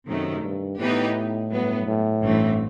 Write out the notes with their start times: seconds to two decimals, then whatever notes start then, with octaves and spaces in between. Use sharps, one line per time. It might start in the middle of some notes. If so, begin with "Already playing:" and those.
0.09 F#2 C3 D#3 A3
0.44 G2
0.80 A2 E3 B3 D#4 G4 B4
1.51 G2 F#3 B3
1.87 A2
2.22 A1 G2 E3 A3 C4